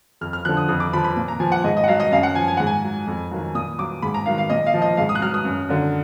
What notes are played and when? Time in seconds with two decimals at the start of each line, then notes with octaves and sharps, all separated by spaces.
0.21 F2 F6
0.33 F6
0.45 D3 F3 F#6
0.57 D#6
0.68 F2 D#6
0.80 D6
0.93 F3 B5
1.04 B5
1.17 A#2
1.28 A#5
1.40 F3 G#5
1.52 F#5
1.64 G#2 D#5
1.77 D#5
1.84 F#5
1.88 F#3 F5
2.00 D#5
2.12 F#2 F5
2.23 F#5
2.35 F3 G#5
2.48 G#5
2.57 G#2 F#5
2.67 G#5
2.83 F#3
3.07 F2
3.31 D#3 F#3
3.54 A#2 D#6
3.78 F#3 D6
4.02 G#2 B5
4.14 A#5
4.26 D#3 F#3 F5
4.38 F5
4.50 A#2 D#5
4.67 F5
4.74 F3
4.82 D#5
4.97 G#2 F5
5.09 D#6
5.15 F#6
5.22 F#3 F6
5.34 D#6
5.45 F#2
5.69 D3 F#3